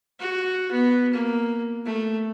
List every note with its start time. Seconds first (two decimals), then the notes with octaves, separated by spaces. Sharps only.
0.20 F#4
0.71 B3
1.13 A#3
1.86 A3